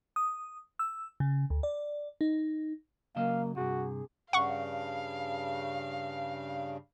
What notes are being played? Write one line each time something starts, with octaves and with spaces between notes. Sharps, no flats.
D#6
E6
C#3
D2
D5
D#4
C#3 F#3 A#3 D#5 F5
G2 C3 F#4 G#4
G2 C#3 F5 F#5 C#6